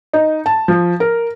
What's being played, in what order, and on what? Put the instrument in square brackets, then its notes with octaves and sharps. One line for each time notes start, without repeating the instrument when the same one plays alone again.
[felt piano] D#4
A5
F3
A#4